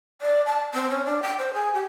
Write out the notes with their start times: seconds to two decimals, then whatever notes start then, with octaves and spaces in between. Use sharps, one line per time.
0.21 D5
0.46 A5
0.74 C4
0.90 C#4
1.05 D4
1.22 G5
1.38 C5
1.53 G#4
1.73 G4